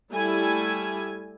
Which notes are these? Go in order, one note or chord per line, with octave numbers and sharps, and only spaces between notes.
G3 A3 E4 G#5